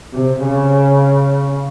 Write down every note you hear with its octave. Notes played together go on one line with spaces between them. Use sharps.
C3
C#3